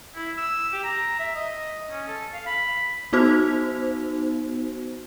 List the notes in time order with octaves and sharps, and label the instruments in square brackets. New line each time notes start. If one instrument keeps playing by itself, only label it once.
[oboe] E4
E6
G4
A#5
E5
D#5
C#4
A4
F5
B5
[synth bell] B3 D#4 F#4 C5